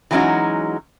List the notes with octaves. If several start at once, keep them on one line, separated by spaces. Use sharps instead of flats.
E3 F#3 G#3 C#4 D#4 F#4